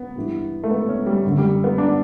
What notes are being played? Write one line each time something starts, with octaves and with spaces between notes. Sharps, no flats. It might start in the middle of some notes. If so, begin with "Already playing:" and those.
Already playing: B3
G2 E3
A3
B3
C#4
G3
F#2 D3
G3
B3
D4